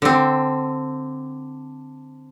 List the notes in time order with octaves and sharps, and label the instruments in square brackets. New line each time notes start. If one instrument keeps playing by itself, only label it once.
[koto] D3 C4